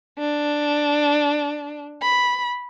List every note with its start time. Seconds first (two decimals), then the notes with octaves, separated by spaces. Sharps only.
0.18 D4
2.02 B5